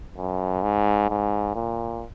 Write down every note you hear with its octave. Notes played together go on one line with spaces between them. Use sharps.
F#2
G#2
G#2
A#2